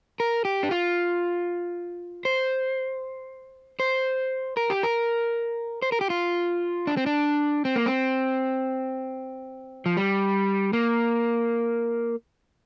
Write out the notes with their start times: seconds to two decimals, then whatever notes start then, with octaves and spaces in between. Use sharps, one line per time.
0.20 A#4
0.45 G4
0.63 D4
0.71 F4
2.25 C5
3.80 C5
4.57 A#4
4.70 G4
4.83 A#4
5.82 C5
5.92 A#4
6.01 G4
6.10 F4
6.87 D4
6.97 C4
7.06 D4
7.65 C4
7.76 A#3
7.86 C4
9.86 F3
9.97 G3
10.73 A#3